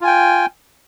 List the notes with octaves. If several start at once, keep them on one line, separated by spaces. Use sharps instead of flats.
F4 G5 G#5